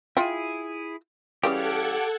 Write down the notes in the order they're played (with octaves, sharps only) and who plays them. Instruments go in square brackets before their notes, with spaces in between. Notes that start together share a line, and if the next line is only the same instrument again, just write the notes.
[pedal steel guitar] E4 G#4 [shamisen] F4 E5 G5
[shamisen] C#3 E3 G3 [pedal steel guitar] G4 F5 [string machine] A4 F#5 G#6